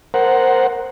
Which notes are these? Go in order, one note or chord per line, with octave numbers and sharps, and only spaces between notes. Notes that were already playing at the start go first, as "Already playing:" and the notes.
A#4 C5 F#5